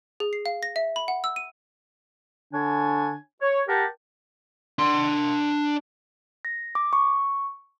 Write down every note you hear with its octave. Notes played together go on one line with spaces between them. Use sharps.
G#4
C7
F5
A#6
E5
B5
F#5
E6
D#7
D3 D4 C#5 G#5
C#5
G4 A#4 F#5 G5 A5
D4 C6
A#6
D6
C#6